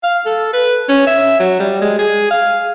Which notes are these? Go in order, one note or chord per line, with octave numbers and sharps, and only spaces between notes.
F5
A4
B4
C#4
E5
F#3
G3
G#3
G#4
F5